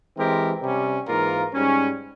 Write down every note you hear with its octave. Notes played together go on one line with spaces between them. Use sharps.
E3 G#3 C4 G4 A#4
C3 G3 C#4
G#2 E3 A#3 F4 A#4
G#2 G3 C#4